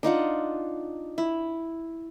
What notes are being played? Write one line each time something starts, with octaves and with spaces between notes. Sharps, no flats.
D4 D#4 F4 F#5
E4